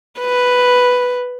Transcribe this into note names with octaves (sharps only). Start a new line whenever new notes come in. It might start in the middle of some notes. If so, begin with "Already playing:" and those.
B4